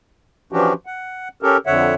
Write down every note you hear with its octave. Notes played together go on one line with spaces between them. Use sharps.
E3 F3 C#4 D4 F#4 G4
F#5
C#4 G4 A4 A#4
F2 D3 C#5 E5 F#5